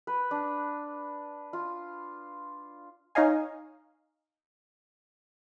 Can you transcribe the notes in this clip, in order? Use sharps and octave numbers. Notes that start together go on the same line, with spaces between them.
B4
D4
F4
D#4 C#5 D#5 F5 G#5